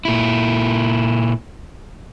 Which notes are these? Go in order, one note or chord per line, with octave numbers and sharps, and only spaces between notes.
A#2 E4